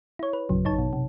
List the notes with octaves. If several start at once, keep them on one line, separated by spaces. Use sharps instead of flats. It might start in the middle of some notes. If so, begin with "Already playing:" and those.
E4 C#5
B4
A#1 F#2 C#3 F#3
A1 D#4 C#5 A5
B2
C3